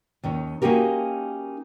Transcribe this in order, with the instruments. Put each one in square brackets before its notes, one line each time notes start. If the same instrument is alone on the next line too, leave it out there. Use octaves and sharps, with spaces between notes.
[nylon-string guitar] D#2 D#3 C#4
A#3 C#4 D#4 F#4 G4 A#4